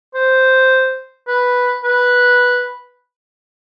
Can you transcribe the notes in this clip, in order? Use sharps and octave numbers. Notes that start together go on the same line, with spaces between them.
C5
B4
B4